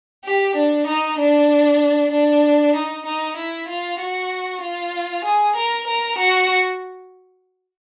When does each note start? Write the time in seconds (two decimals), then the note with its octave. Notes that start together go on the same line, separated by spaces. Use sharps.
0.24 G4
0.56 D4
0.87 D#4
1.18 D4
2.12 D4
2.75 D#4
3.06 D#4
3.37 E4
3.68 F4
4.00 F#4
4.62 F4
5.25 G#4
5.56 A#4
5.87 A#4
6.18 F#4